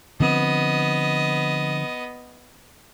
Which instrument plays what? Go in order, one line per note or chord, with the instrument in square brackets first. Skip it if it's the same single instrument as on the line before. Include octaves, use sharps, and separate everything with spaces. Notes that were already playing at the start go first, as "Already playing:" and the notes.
[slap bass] D3 F3 C4 [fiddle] B3 D#5